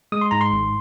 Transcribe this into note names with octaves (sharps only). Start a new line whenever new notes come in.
G#3 D#6
C6
G#2 A#5
C6
G#1